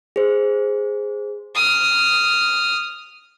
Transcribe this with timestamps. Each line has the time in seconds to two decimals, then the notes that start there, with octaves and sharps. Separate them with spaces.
0.16 G#4 C5
1.55 D#6 F6